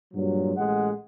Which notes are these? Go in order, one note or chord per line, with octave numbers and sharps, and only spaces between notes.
G2 A#2 F#3
A1 G#3 F#5